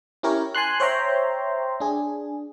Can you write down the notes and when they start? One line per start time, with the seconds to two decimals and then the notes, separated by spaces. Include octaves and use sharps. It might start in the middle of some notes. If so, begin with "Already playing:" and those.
0.23 C#4 E4 G4 A#4 C#5
0.55 G#5 A5 C6 F#6
0.80 C5 C#5 E5 G5 A#5 C6
1.80 D4 G#4